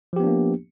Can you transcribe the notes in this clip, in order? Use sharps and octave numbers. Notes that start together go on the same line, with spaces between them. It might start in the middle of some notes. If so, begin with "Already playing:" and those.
F3 A#3 B3 D4 G4